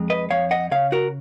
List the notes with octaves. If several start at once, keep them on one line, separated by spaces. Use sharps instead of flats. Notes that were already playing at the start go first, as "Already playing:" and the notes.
Already playing: F2 G#3
B4 D#5
F2 C#5 F5
D#5 F#5
C#3 C#5 F5
F#4 A#4